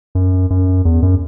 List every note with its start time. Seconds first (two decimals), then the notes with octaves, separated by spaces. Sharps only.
0.15 F#2
0.50 F#2
0.85 E2
1.02 F#2